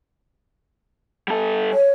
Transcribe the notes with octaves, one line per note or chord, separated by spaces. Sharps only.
G3 A4
C#5